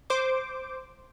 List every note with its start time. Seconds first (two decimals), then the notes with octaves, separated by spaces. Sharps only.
0.10 C5 D6